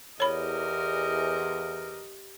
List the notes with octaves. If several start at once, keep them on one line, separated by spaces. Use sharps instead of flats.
E2 G4 A#4 C#5 D#5 B5